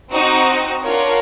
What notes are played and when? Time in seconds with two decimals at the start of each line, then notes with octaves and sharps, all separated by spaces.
0.10 C4 D#4 F#4
0.81 D4 F4 A#4 C#5 F#5